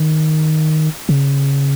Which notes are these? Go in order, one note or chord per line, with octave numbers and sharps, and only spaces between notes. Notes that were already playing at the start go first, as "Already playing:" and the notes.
Already playing: D#3
C#3